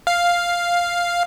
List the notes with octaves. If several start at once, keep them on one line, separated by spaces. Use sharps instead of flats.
F5